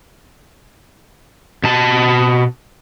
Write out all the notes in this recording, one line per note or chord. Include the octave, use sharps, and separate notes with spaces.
B2 A5